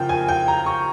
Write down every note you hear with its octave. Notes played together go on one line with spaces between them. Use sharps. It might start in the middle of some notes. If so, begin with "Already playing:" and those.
Already playing: C#3 F3 A#3 G5
G#5
G5
A#5
C#6